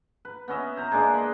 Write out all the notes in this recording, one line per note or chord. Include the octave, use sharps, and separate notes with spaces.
B4
B3 C#4 D#5 E5
C5 A#5
G#3 A#3 D4 G#4
D#5 B5